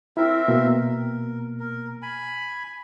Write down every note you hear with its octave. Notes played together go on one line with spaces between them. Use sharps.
C4 E4 A#4 E5
B2 A#3
A#4
A#4
G#5 B5